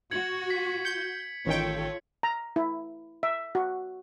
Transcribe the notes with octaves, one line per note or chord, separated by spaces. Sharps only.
F#4 G#6 C#7 F#7
B6
G6 C#7
A1 D#3 F4 A4 C#5 G5
A#5
E4
E5
F#4